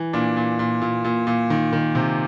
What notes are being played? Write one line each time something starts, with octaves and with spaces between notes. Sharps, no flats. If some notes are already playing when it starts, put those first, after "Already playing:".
Already playing: E3
A#2 D4
A#2
A#2
A#2
A#2
A#2
D#3
D#3
C3